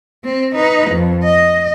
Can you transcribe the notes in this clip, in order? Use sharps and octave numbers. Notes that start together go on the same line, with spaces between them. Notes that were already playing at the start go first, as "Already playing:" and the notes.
C4
D#4 B4
F2
D#5